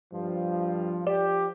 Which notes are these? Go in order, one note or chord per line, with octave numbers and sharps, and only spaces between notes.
G2 F3
F3 G4 D5